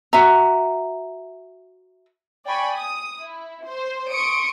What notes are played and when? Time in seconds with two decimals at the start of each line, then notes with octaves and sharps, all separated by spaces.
0.13 F#4 E5 A#5
2.45 D5 G5 G#5 B5 C#6
2.74 D#6
3.21 E4
3.66 C5
4.12 C6 C#6 D#6 C#7 D7